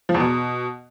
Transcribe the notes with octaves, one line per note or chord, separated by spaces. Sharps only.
F3
E2
B2